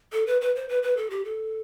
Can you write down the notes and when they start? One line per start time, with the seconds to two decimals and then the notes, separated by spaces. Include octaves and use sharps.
0.13 A4
0.27 B4
0.41 B4
0.55 C5
0.69 B4
0.83 B4
0.97 A4
1.10 G4
1.25 A4